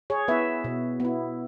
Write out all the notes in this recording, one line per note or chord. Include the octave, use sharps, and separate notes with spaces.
G#4 C#5
B3 E4 B4 E5
B2
B3 E4